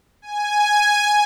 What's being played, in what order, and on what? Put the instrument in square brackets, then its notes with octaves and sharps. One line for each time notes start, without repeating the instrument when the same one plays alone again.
[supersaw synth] G#5